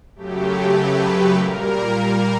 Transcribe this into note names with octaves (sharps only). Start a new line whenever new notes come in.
F#2 C#3 F#3 A3 G4
B4
A#2 G3 A#3 A#4
A#4